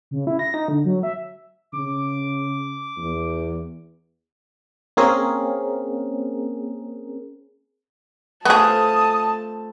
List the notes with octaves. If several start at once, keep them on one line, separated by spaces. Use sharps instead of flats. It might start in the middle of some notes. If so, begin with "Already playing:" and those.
C#3
E4
A#6
D#4
D3
F#3
E5
C#3 D6
E2
A#3 C4 C#4 G#4 A#4
A3 B3 C4 F4 G#4 A5 D#6